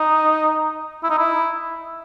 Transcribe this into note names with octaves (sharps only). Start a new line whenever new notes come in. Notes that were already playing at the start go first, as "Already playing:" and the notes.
Already playing: D#4
E4
D#4
E4